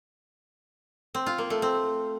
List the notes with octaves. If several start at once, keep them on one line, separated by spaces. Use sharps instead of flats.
C4
F4
A#3
A3
C4